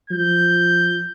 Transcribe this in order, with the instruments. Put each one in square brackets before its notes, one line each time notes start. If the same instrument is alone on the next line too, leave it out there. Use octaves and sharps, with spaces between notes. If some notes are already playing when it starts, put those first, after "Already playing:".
[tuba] F3 [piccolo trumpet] G6